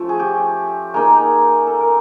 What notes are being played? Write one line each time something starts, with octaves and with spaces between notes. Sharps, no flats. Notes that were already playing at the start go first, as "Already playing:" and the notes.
Already playing: F3 A3 C#4
G#4
G4
A#3 D#4 G#4
A4
A#4